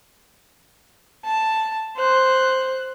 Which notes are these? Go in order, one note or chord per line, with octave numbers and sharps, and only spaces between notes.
A5
C5 F#6